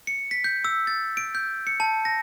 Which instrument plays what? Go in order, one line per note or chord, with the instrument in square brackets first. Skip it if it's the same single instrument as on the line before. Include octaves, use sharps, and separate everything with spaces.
[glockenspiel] C#7
B6
G6
E6
A6
D7
G6
C#7
A5
A#6